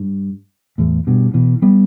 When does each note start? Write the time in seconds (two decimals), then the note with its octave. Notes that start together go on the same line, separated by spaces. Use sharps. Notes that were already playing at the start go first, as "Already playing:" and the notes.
Already playing: G2
0.78 E2 A2
1.07 G2 B2
1.34 B2 E3
1.62 G3 B3